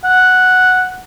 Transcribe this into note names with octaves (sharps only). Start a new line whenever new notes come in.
F#5